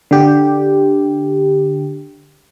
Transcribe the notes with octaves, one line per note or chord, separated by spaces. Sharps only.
D3 G4